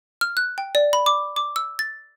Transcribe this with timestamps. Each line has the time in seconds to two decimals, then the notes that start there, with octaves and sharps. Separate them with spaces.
0.21 F6
0.37 F#6
0.58 G5
0.75 D5
0.93 B5
1.06 D6
1.36 D6
1.56 E6
1.79 A6